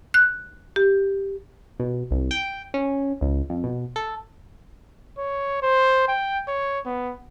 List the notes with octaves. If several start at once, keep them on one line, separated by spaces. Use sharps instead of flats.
F#6
G4
B2
C2
G5
C#4
C#2
F2
B2
A4
C#5
C5
G5
C#5
B3